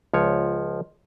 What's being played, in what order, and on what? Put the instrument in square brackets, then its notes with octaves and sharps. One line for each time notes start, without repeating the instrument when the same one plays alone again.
[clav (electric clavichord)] C#2 F3 C#5